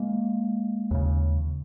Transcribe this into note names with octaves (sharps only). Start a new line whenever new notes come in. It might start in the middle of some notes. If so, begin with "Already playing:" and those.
Already playing: G#3 A#3
D#2 C#3